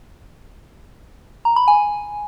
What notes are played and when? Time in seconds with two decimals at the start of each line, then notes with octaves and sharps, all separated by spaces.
1.45 A#5
1.56 B5
1.68 G#5